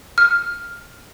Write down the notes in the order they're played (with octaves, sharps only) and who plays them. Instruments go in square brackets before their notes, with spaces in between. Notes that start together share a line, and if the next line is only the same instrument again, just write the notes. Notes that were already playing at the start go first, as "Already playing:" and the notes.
[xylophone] F6